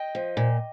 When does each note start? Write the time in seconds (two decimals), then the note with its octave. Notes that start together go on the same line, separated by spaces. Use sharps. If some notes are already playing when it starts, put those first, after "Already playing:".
Already playing: D#5 G5
0.15 F3
0.37 A#2